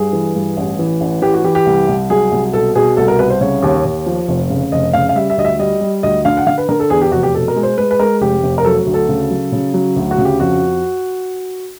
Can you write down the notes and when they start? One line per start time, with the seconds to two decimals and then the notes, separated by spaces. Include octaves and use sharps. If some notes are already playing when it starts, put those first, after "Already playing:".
Already playing: G2 G#4
0.13 E3
0.35 G2
0.57 A1
0.79 E3
1.01 A1
1.22 E3 G4
1.34 F#4
1.44 E3 G4
1.55 G4
1.66 C2
1.88 C2
2.10 F#3 G#4
2.32 C2
2.53 B2 A4
2.75 B2 G#4
2.97 C2 A4
3.08 A#4
3.19 C2 B4
3.30 C5
3.41 C#3 C#5
3.63 D#2
3.85 D#2
4.06 F3
4.28 F1
4.50 C#3
4.72 F1 D#5
4.93 C#3 F5
5.09 F5
5.16 G3 E5
5.30 E5
5.37 D2 D#5
5.45 E5
5.59 G3 D#5
5.81 G3
6.03 D2 D#5
6.25 D3 F5
6.37 F#5
6.47 D3 F5
6.58 B4
6.69 D3 A#4
6.80 A4
6.90 E2 G#4
7.02 G4
7.12 F1 F#4
7.23 G4
7.34 B2 A4
7.48 A#4
7.56 G#3
7.63 C5
7.77 G#3 B4
7.91 B4
7.99 G#3 A#4
8.21 F1 G4
8.43 F1
8.58 A#4
8.65 F#3 A4
8.87 D2
8.94 A4
9.09 C#3
9.31 F#3
9.52 C#3
9.74 F#3
9.96 D2
10.11 F#4
10.18 C#3
10.25 G4
10.40 F2 F#4